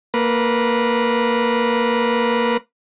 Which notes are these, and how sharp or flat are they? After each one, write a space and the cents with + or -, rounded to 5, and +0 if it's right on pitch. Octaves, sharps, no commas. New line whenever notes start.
A#3 -5 B4 -15